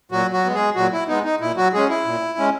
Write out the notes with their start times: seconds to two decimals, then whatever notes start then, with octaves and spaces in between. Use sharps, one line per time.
0.11 A#2 F#3 F#4
0.33 F#3 F#4
0.44 G#3 B3
0.55 G#3 G#4
0.76 A#2 F#3 F#4
0.93 E4
1.08 G#3 B3 D#4
1.24 D#4
1.40 A#2 E4
1.57 F#3 F#4
1.73 G#3 C#4 G#4
1.89 E4
2.05 A#2
2.38 G#3 C#4